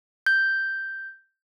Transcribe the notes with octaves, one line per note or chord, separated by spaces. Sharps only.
G6